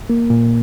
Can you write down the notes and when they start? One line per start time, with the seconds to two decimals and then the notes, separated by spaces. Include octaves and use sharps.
0.10 A#3
0.30 A#2